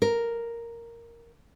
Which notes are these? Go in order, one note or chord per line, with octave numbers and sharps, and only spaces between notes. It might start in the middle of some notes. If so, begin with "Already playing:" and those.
A#4